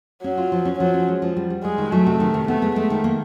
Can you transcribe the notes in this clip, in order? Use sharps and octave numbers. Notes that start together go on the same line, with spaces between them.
F#3 C#4
F4
F3
C#4
F3 F#3
C#4
G#3
F3
G3
G3
G3 G#3
D#3
F#3 A3
C3
D#3
C3
A3 B3
G#3
G#3 A3
D#3
A#3